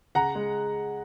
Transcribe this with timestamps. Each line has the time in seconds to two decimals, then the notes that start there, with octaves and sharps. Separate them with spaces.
0.15 C#3 F#5 A#5
0.35 G#3